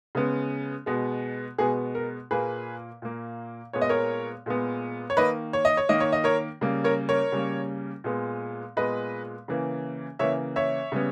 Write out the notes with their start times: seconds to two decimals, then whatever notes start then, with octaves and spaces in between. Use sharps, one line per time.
0.15 C#3 G#3 B3
0.86 B2 G#3 B3
1.58 B2 G#3 B3 G#4
1.95 A#4
2.31 A#2 A#3 G#4 B4
3.02 A#2 A#3
3.73 A#2 G#3 B3 C#5
3.81 D#5
3.89 A#4 C#5
4.46 A#2 G#3 B3
5.10 C#5
5.17 D#3 A#3 B4 D#5
5.53 C#5
5.65 D#5
5.77 C#5
5.89 D#3 A#3 D#5
6.00 C#5
6.12 D#5
6.24 A#4 C#5
6.61 C#3 G3 A#3
6.84 A#4 C#5
7.09 A#4 C#5
7.32 C#3 G3 A#3
8.04 A#2 G#3 B3
8.76 A#2 G#3 B3 B4 D#5
9.48 C#3 E3 A#3
10.19 C#3 E3 A#3 C#5 E5
10.56 C#5 E5
10.92 C#3 G3 B3